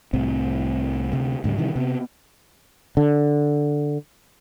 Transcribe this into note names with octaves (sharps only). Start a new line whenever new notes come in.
C2 A2 C4
D2 C3
D2 G#2 C#3 G3
C3 D#3 E3 G3
C3 B3
D3